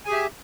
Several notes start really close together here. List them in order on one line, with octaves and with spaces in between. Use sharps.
G#5 G#4 G4 E5